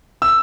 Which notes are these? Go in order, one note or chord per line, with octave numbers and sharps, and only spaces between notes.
E6